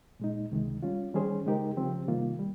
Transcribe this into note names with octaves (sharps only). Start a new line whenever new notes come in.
A#2 G#3 D#4
C#2 C3 D#3 G#3
G3 C#4 F4
D#3 G3 C#4 G#4 C5
C#3 G#3 D#4 G4 A#4
C#3 F3 C4 G4
C3 D#3 G3 A#3 F4
G3